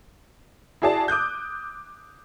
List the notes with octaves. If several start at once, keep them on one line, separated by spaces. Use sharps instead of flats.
E4 F#4 G#4 D5 A5
D6 D#6 F#6 G6